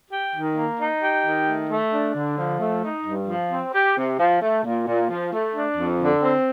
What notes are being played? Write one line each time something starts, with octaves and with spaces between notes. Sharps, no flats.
G4
D#3
A#3
D#4
G4
D#3
A3
A3
D4
D3
F3
A3
D#4
G2
F3
C4
G4
C3
F3
A3
A#2
A#2
F3
A3
D4
F2
D3
C4